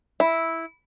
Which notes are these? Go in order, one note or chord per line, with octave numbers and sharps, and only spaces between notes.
E4